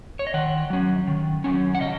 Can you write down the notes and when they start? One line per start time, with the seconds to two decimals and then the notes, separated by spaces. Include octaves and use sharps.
0.19 C#5
0.27 D#5
0.34 D#3 F#5
0.70 F#3 C#4
1.07 D#3
1.44 F#3 C#4
1.75 F#5
1.81 C#3 D#5